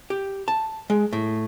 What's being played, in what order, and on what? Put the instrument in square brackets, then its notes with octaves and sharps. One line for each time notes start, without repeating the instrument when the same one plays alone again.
[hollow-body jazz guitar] G4
A5
G#3
A2